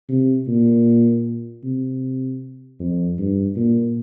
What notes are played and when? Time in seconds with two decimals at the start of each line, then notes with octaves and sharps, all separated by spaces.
0.09 C3
0.47 A#2
1.63 C3
2.79 F2
3.18 G2
3.56 A#2